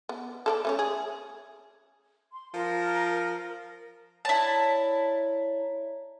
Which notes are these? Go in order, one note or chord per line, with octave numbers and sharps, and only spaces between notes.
B3
A4 A#4 D5
A3 C#4 C#5
G#4
C6
F3 A#4
E4 C#5 D5 A5 A#5